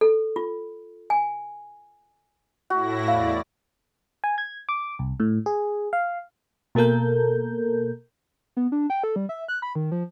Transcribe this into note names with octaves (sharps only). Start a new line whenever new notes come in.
A4
F4
G#5
A2 E4 F#4 A#6
E2 D5 F5
G#5
G#6
D6
C2
A2
G#4
F5
B2 A#3 A4 A#4 G6
B3
D4
G5
A4
G3
E5
F#6
B5
D#3
F3